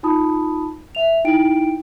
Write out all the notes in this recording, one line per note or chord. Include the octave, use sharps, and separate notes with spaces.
D#4 F4 A5 B5 D#6
E5 F7
D#4 E4 G5 D7